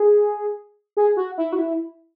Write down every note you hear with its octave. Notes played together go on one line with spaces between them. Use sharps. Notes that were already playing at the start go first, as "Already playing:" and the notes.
Already playing: G#4
G#4
F#4
E4
F#4
E4